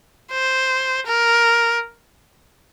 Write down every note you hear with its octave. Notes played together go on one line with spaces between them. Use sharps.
C5
A#4